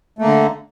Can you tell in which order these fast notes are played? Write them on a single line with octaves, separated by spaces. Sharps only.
A3 A#3 D3